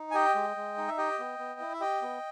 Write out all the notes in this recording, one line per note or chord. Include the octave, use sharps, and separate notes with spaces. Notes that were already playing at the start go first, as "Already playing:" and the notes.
Already playing: D#4
G#5
G4 D#5 G5
G#3
G#3
D#4
E5
G4 D#5 G5
B3
B3
E4
E5
G4 D#5 G5
B3